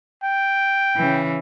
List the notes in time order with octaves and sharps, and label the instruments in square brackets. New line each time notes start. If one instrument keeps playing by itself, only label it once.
[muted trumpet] G5
[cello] C#3 E3